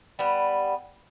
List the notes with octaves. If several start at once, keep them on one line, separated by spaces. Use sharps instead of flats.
G3 B3